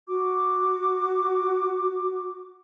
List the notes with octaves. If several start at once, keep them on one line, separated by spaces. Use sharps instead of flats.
F#4 D6